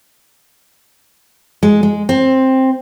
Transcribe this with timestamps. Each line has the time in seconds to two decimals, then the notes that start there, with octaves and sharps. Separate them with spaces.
1.63 G#3
1.83 G#3
2.09 C4